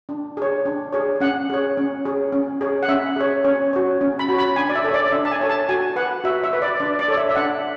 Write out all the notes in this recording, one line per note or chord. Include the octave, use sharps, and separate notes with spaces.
D4
G#4 C#5
D4
G#4 C#5
C#4 F#5
G#4 C#5
C#4
G#4 C#5
C#4
G#4 C#5
F#5
C#4 E5
G#4 C#5
C#4 C#5
F#4 C#5
C#4
B5
F#4 C#5
B5
D4 G#5
D5
E5
A4 C#5
D5
D4 E5
A5
G#5
A4 C#5
A5
F#4 G#5
B4 F#5
F#4 E5
E5
B4
D5
D4 D5
D5
A4 C#5
E5
E5
D4 F#5